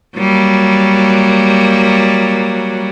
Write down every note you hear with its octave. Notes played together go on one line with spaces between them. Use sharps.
F#3 G3 A#3